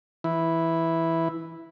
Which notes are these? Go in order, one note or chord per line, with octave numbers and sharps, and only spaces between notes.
E3 E4